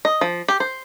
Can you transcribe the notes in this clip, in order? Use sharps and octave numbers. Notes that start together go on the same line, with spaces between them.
D#5
F3
G4
C5